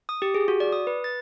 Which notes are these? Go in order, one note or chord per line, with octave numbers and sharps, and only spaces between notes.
D#6
G4
G#4
F#4
D5
D#6
B4
A6